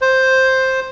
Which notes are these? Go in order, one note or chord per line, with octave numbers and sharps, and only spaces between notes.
C5